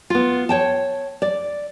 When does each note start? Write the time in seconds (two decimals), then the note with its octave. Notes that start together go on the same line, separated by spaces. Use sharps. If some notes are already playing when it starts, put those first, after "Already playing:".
0.10 B3 F4
0.49 C#5 G5 A5
1.22 D5